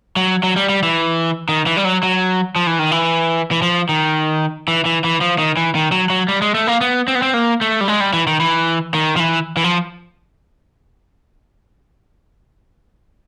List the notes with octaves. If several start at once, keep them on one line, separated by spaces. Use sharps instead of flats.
F#3
F#3
G3
G3
E3
D#3
E3
G3
F#3
F#3
F3
E3
D#3
E3
E3
F3
D#3
E3
E3
E3
F3
D#3
E3
D#3
F#3
F#3
G3
G#3
A3
A#3
B3
C4
B3
C4
A#3
A3
G3
G#3
G3
E3
D#3
E3
D#3
F3
E3
E3
F3